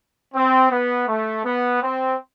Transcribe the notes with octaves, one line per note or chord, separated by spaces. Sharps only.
C4
B3
A3
B3
C4